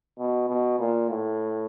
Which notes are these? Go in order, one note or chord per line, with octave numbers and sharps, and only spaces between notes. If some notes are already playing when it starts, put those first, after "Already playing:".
B2
B2
A#2
A2